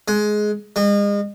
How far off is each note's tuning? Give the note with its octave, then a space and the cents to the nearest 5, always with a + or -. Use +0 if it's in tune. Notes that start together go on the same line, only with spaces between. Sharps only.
G#3 +15
G#3 -35